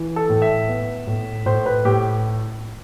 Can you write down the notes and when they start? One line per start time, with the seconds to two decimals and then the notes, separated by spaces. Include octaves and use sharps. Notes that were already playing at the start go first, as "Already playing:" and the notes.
Already playing: E3
0.16 A4
0.29 A2
0.42 E5
0.68 B3
1.07 A2
1.46 A2 C5
1.66 B4
1.85 A2 G4